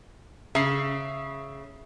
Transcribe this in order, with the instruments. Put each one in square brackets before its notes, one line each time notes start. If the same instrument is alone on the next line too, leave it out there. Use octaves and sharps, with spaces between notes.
[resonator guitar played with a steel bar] C#3 [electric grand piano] E5 C7